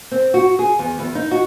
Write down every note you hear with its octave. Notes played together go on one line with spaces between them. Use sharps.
C4
F#4
G#4
E2
E2
D#4
F#4